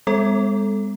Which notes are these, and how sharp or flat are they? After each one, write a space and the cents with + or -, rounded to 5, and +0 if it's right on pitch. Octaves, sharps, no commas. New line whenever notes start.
G#3 -40 B3 +40 A4 +0